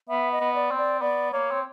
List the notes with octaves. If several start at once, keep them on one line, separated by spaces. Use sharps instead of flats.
B3 E5
D#5
B3
D5
C4
D5
B3 D5
A#3 C#5
C4